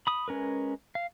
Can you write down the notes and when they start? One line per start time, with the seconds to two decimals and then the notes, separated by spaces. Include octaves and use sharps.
0.07 B5 D#6
0.28 G#3 C#4 A#4 B4
0.95 F5